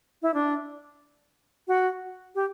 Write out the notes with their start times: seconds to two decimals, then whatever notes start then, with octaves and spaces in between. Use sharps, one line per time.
0.22 E4
0.34 D4
1.68 F#4
2.35 G4